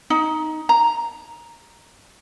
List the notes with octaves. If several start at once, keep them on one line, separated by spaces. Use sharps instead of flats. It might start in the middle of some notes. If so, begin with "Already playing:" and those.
D#4
A#5